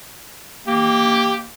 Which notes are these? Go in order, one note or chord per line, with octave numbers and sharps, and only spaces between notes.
A#3 G4